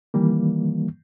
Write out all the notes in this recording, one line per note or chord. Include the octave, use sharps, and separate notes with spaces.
D#3 E3 G3 A#3